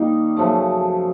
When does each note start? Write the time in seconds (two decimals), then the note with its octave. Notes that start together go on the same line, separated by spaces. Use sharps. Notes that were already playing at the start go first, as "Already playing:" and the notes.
Already playing: D#3 G3 A#3 D#4
0.36 F#2 C#3 F3 A3